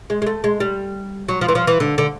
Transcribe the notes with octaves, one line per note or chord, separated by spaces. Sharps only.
G#3
G#3
A3
G#3
G3
F#3
F3
E3
F3
E3
D3
D3